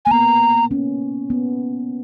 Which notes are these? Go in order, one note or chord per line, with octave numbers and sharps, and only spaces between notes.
A#3 G#5
B3 A#5
C#4
B3